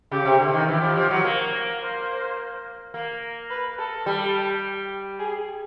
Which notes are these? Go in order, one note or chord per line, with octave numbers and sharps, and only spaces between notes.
C#3 G4
C3
D3
D#3
E3 G4
F3
F3
F#3
A#3
C5
A#3
B4
A4
G3
G#4